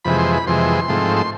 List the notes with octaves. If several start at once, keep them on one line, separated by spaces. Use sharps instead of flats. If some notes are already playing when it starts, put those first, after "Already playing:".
F2 C3 E3 G#3 B5
C6
B5
F2 C3 E3 G#3 C6
G#2 F3 A3 C4
C6